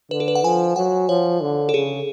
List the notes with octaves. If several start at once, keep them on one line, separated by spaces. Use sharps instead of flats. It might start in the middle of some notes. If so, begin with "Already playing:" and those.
D3 B4
A4
B4
F#5
F3 G#5
F#3 F#5
F3 C#5
D3
A4
C#3 G#4